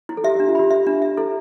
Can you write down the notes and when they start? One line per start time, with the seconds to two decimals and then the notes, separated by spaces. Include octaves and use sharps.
0.09 E4
0.17 A4
0.24 G4 E5
0.35 D4 G4
0.48 F4
0.55 G4 B5
0.70 E5
0.87 D4
1.02 E5
1.17 E4 A4